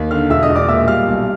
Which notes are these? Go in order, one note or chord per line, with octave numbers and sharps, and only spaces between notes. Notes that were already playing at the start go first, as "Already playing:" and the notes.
Already playing: D#2
D3 F5 F6
E1 E5 E6
D#5 D#6
E1
D5 D6
A#2 E5 E6
G3 F5 F6
B1